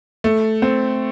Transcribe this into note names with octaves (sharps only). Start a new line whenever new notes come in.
A3
C4